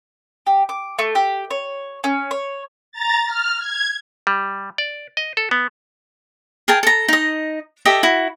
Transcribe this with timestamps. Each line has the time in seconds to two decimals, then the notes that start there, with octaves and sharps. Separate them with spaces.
0.47 G4
0.69 D6
0.99 A3
1.15 G4
1.51 C#5
2.04 C#4
2.31 C#5
2.92 A#5 A6
3.26 F6
3.59 G#6
4.27 G3
4.78 D5
5.17 D#5
5.37 A4
5.51 B3
6.68 G#4 A#4 G5 A5
6.83 A4 A#5
7.08 D#4 D#5
7.85 G4 A4 D#5 E5
8.03 E4 F#4